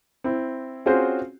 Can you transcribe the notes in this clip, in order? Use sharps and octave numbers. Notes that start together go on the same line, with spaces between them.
C4 E4
C4 C#4 F4 F#4 G#4 C5